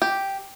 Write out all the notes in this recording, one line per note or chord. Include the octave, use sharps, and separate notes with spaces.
G4